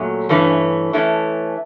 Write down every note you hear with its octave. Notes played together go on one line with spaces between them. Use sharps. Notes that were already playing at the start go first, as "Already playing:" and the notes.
Already playing: A#2 F#3 A3 C#4
G2 E3 A3 C#4
E3 A3 C#4